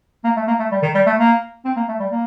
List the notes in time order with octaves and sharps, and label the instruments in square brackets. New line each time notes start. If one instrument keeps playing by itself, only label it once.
[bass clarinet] A#3
A3
A#3
A3
G3
D#3
G3
A3
A#3
C4
A#3
A3
G3
A#3